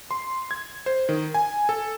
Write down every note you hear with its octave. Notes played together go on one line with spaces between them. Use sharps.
C6
G#6
C5
D#3
G#5
A4